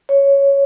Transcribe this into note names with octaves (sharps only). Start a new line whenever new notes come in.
C#5